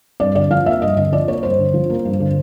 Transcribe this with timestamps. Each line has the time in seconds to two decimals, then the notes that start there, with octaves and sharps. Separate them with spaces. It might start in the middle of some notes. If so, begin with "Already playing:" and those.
0.20 G2 D5
0.35 D3 D5
0.50 F3 F5
0.66 A#3 E5
0.82 G2 D#5
0.97 D3 D#5
1.12 F3 D5
1.28 A#3 C#5
1.43 G2 C5
1.59 D3
1.74 F3
1.90 A#3
2.05 G2
2.20 D3